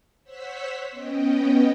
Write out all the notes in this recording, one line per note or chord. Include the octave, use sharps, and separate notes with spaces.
C5 C#5 F#5 E6 B6
B3 C#4 D#5 G5